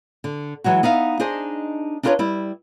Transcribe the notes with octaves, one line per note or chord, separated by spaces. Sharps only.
D3
E3 F#3 G#3 F#4
B3 D#4 E5 F5
D4 D#4 G#4 C5 D#5
D4 D#4 F4 A4 B4 C#5
G3 E4